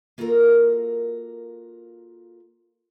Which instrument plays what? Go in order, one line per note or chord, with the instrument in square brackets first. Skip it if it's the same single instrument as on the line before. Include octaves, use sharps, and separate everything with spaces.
[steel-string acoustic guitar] A#3 F4 F#4 A4 A#4 A#5